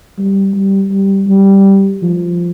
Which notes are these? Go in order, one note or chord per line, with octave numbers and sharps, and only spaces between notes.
G3
G3
G3
G3
F3